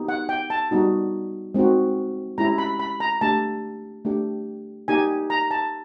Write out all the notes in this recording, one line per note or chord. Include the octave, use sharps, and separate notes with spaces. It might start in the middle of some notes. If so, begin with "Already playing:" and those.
Already playing: B3 D#4 G4
F#5
G5
A5
G3 B3 D#4 F#4
G#3 C4 D#4 F#4
G#3 C#4 E4 G4 A#5
B5
B5
A#5
A3 D4 G4 A5
A3 D4 G4
A#3 D#4 G4 G#5
A#5
A5